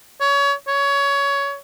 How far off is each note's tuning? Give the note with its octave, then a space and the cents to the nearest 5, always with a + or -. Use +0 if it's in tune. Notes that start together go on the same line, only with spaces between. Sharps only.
C#5 +25
C#5 +20